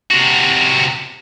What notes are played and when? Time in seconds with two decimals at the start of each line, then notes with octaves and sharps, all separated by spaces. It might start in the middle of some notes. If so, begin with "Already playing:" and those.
0.11 C3 F#4